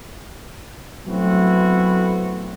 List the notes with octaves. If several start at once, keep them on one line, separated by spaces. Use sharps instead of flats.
F#3 A3 B3 C4 E4 F#4